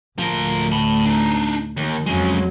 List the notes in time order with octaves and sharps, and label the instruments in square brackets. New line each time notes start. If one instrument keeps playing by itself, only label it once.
[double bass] D2 A2 [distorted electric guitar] F3 A#4
[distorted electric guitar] A5 B5
D4 D#4
[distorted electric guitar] D#2 [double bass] D#3
[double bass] F2 F#3 [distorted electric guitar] G#3 C#4